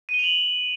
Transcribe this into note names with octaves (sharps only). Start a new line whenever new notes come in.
D#7
G7
F7
F#7